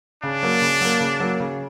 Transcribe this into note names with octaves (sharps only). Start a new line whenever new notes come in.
C#3 D4
F#3 A#3
C#3
F#3 A#3
C#3
F#3 A#3
C#3